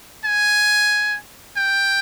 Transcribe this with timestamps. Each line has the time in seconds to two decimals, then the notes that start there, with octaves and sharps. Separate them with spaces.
0.25 G#5
1.56 G5